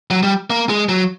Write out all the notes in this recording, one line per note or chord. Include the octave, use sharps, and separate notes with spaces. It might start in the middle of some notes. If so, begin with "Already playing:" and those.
F#3
G3
A#3
G#3
F#3